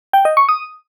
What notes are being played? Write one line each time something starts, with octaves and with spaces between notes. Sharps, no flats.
G5
D#5
C#6
D#6